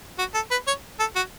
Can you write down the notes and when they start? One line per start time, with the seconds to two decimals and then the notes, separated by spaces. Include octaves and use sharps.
0.19 F#4
0.35 A4
0.51 B4
0.67 C#5
1.00 A4
1.16 F#4